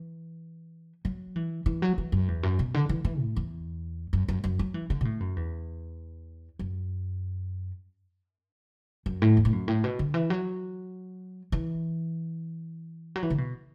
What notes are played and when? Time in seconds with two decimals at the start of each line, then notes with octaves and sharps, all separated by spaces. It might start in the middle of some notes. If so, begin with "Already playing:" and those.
Already playing: E3
1.05 F#3
1.36 E3
1.66 E3
1.82 F#3
1.98 E3
2.12 F#2
2.28 E2
2.43 F#2
2.59 B2
2.74 D3
2.89 E3
3.05 E3
3.20 A2
3.36 E2
4.13 F#2
4.28 F#2
4.44 F#2
4.59 F#3
4.74 E3
4.90 D3
5.01 B2
5.05 A2
5.20 F#2
5.36 E2
6.59 F#2
9.06 F#2
9.22 A2
9.37 E2
9.45 A2
9.53 F#2
9.68 A2
9.84 B2
9.99 D3
10.14 E3
10.30 F#3
11.52 E3
13.16 F#3
13.23 E3
13.30 D3
13.38 B2